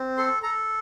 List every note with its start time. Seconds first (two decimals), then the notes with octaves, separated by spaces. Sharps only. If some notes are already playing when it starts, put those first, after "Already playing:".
Already playing: C4
0.17 A4 C6
0.43 A4 A#5